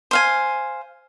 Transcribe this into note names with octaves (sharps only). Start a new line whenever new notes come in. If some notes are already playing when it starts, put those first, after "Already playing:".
C5 F5 G#5